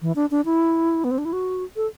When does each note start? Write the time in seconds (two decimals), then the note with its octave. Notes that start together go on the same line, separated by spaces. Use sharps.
0.02 E3
0.16 D4
0.31 D4
0.45 E4
1.04 B3
1.11 C4
1.18 D4
1.25 E4
1.33 F#4
1.77 A4